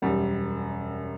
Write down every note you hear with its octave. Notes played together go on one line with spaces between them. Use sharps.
E1 F#2 G3